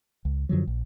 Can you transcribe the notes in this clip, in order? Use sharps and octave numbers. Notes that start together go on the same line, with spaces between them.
C#2
F#2 D3 F3 F#3
A#1